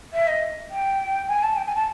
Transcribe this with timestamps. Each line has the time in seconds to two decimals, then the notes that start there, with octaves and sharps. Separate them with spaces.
0.13 E5
0.27 D#5
0.70 G5
1.28 G#5
1.43 A5
1.56 G5
1.66 G#5
1.75 A5